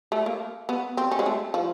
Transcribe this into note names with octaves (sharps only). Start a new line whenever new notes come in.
A3
A#3
B3
C4
C#4
G#3
A3
F3